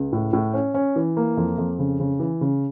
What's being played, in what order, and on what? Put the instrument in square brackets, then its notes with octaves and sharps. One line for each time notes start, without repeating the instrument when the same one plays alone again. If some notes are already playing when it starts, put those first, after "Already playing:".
Already playing: [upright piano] C#2
A2
A2
C#4
C#4
E3
A#3
F2
F2
C#3
C#3
E3
C#3